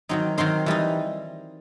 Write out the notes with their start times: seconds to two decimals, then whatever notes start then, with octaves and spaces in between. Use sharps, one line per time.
0.09 D#3 F#3 C4 D#4
0.38 D#3 F#3 C4 D#4 C6
0.66 E3 G3 D#4